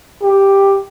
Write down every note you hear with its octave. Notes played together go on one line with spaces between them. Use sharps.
G4